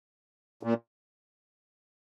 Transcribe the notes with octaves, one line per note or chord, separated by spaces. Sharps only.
A#2